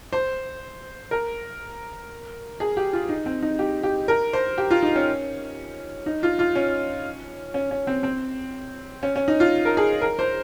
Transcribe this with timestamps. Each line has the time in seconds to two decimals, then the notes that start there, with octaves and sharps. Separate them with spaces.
0.13 C5
1.11 A#4
2.60 G#4
2.77 G4
2.93 F4
3.09 D#4
3.26 C4
3.43 D#4
3.59 G4
3.83 G4
4.08 A#4
4.33 C5
4.58 G4
4.71 F4
4.83 D#4
4.96 C#4
6.06 D#4
6.23 F4
6.39 F4
6.56 C#4
7.54 C#4
7.71 C#4
7.87 C4
8.03 C4
9.03 C#4
9.16 C#4
9.28 D#4
9.40 F4
9.65 A#4
9.77 G#4
10.01 A#4
10.19 C5